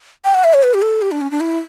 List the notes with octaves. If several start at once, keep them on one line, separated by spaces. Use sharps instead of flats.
G5
F#5
E5
C#5
B4
G4
A4
G4
D4
C#4
D4
E4